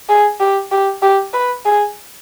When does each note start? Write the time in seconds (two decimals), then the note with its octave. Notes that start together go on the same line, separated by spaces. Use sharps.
0.09 G#4
0.40 G4
0.72 G4
1.02 G4
1.33 B4
1.66 G#4